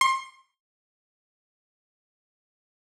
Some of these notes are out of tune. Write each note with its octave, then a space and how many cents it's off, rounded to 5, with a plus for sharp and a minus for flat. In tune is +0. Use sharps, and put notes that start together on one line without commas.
C6 +30